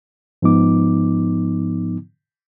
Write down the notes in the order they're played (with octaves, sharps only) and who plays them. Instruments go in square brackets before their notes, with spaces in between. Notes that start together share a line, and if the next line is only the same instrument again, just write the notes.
[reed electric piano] G#2 F3 B3 D#4 D6